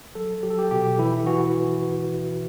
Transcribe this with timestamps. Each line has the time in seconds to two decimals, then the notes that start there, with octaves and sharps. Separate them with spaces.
0.15 F#3 A4
0.43 F#3 G4
0.50 A4
0.59 G4
0.71 B2 G4
0.98 E3 E4
1.26 E3 F#4